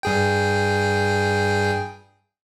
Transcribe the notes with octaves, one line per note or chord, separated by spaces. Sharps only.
G2 G#4 G5